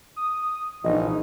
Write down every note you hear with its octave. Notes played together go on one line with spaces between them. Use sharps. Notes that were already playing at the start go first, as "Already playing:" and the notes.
D#6
A#1 E3 D#4 D#5